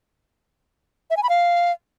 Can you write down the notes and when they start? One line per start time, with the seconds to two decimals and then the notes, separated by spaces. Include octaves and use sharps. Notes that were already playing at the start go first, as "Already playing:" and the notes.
1.10 E5
1.17 G#5
1.23 B5
1.29 F5